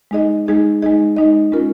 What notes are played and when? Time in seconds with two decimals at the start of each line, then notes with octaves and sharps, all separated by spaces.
0.11 G#3 D#4 G#4 D#5
0.46 G#3 D#4 G#4 D#5
0.82 G#3 D#4 G#4 D#5
1.17 G#3 D#4 G#4 D#5
1.52 G#3 C#4 F4 A#4